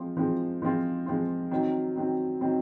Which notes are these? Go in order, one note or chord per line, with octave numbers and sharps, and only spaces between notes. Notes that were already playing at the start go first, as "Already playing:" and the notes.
Already playing: F3 G#3 C4 F4
F3 G#3 C4 F4
F3 G#3 C4 F4
F3 G#3 C4 F4
D#3 F#3 C4
D#3 F#3 C4
D#3 F#3 C4